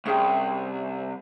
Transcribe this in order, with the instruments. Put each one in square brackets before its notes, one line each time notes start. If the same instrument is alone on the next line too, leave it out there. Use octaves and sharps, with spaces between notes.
[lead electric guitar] C2 [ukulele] C#4 G#4 G5